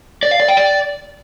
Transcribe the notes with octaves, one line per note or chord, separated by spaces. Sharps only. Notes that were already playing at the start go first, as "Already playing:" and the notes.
D5
F5
D5
G5
D5